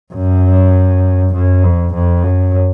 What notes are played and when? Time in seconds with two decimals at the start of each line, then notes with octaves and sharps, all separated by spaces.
0.14 F#2
1.33 F#2
1.64 F2
1.94 F2
2.23 F#2